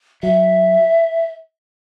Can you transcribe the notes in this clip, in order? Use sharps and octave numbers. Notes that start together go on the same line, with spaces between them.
F#3 E5